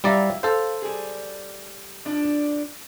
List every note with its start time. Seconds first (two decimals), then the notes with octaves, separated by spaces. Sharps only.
0.04 F#3 G3 E4 D5 F5 A#5
0.43 A4 C5 F5
0.82 G3 G#4
2.05 F3 D4